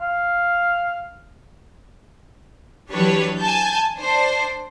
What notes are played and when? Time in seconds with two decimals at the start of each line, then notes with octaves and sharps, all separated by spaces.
0.01 F5
2.91 E3 F#3 D4 G4 B4 C#5
3.38 G#5 A5 G6
3.98 D4 C5